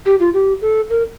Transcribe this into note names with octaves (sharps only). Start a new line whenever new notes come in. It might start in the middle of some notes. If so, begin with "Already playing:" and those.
G4
F4
G4
A4
A#4